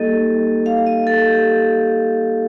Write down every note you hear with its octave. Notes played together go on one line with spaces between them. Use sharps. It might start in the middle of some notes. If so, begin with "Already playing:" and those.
Already playing: G3 A#3 D#4 G4 A4 D#5
F5
D#5
A4
G4